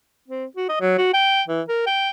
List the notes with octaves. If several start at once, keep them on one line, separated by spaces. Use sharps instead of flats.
C4
F#4
D#5
F#3
F#4
G5
E3
A#4
G5